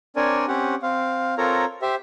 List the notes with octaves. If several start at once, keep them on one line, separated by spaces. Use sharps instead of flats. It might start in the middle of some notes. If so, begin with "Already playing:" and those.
C4 D4 A#4 C#5 D5 G#5
C4 C#4 G4 F#5
C4 F5
C4 F4 A4 A#4 C#5 A#5
G4 C5 E5